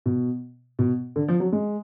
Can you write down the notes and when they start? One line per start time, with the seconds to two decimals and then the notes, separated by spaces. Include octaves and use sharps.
0.06 B2
0.79 B2
1.16 D3
1.28 F3
1.40 F#3
1.52 G#3